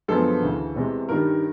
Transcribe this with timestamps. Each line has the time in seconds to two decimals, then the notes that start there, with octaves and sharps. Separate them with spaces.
0.08 F#2 D3 F3 G#3 B3 A4
0.42 D2 C#3 E3
0.76 E2 C3 E3 G#3
1.09 G2 D#3 G3 A#4